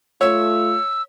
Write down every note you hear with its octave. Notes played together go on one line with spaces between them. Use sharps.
A3 F4 C#5 E6